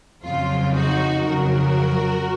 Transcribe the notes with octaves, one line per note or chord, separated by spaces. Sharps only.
F2 C#3 F#3 F4
D#4 F#4
F2 C#3 F#3 F#4 A#4